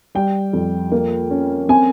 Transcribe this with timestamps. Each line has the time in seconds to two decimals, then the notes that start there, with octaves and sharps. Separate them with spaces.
0.15 G3 G5
0.53 F2
0.92 A#3
1.31 C#4
1.69 C4 G#5